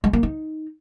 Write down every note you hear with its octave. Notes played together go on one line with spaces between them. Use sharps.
G#3
A#3
D#4